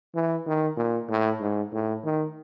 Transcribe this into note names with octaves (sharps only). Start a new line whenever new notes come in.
E3
D#3
A#2
A2
G#2
A2
D#3